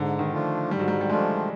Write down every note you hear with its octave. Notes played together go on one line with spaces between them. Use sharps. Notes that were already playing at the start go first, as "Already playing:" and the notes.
Already playing: G#2 D3
D#3
F3 A3 D4 F4
G#2 G3
F#3
G3
G3
F3 G#3 A3 D4 F4